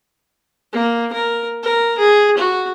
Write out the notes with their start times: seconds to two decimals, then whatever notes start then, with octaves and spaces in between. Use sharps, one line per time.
0.73 A#3
1.13 A#4
1.63 A#4
1.98 G#4
2.37 F#4